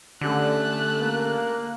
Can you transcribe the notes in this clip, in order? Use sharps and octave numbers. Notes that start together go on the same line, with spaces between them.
D3 A3 C#4 G4 A4 F#6
A#3